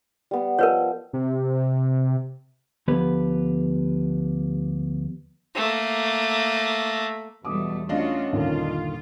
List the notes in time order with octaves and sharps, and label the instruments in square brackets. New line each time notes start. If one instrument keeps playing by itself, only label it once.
[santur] G3 B3
[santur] F3 D#5 [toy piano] A#4 B4 C#5
[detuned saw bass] C3
[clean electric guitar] D2 F3 B3 G4 B4 B5
[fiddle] A3 A#3
[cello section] E2 G3 A3 [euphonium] B2 [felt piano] D6 D#6
[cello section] A3 F4 F#4 [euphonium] C#4 [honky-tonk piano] D4 D#5 F5
[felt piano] G1 D#2 A#2 [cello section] F4